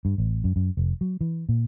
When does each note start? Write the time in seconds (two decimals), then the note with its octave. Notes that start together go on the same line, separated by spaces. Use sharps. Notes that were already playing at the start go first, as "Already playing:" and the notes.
0.05 G2
0.18 A1
0.44 F#2
0.56 F#2
0.77 F1
1.01 F#3
1.21 E3
1.49 A#2